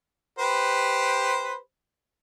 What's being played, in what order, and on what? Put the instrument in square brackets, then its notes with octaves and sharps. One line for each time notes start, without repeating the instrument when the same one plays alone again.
[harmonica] G4 B4 C5